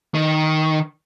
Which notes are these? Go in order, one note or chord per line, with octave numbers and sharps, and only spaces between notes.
D#3